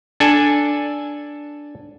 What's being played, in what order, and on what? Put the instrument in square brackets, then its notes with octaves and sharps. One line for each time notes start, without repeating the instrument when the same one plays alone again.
[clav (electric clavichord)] D4 A4 G#5